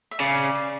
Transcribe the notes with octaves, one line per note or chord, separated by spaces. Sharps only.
E5
C#3 D5